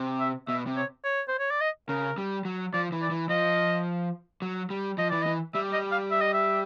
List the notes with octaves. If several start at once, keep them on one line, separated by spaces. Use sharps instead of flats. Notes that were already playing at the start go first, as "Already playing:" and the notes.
Already playing: C3
E5
B2 E5
C3
C#5
C#5
C5
C#5
D5
D#5
C#3 A#4
G3
F#3
F3 D5
E3
D5
E3
F3 D#5
F#3
G3
F3 D#5
E3 D5
E3 D#5
G3 E5
D#5
F5
E5
D#5
E5